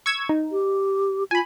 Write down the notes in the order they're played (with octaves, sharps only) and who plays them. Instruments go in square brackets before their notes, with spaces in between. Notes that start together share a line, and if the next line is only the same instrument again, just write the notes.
[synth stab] C#6 E6 G#6
D#4
[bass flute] G4
[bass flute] F4 [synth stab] G#5 B5